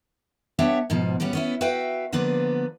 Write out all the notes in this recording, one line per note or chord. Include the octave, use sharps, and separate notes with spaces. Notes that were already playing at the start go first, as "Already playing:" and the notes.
B3 D4 G4 C#5 E5 F#5
G#2 B2 F3
A2 G3 B3 C#4 F#4
B3 C#4 E4
F#4 B4 E5 F5 G5
D3 F3 A#3 B3 B4 D5